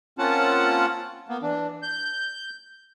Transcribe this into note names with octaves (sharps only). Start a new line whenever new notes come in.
A#3 C4 C#4 F4 F#5 A5
A#3 B3
E3 D4
G6